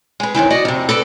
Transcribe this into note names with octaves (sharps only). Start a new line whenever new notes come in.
G#3 B4
F#2 C3 D#3 E3
F#4 D5 D#5
F2 C3
A4 B4 D5